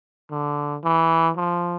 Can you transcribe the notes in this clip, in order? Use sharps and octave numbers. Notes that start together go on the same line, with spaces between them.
D3
E3
F3